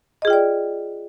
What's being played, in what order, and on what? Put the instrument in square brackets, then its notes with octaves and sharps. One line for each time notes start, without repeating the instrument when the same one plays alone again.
[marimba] D#5
G#4
F4
G5
D5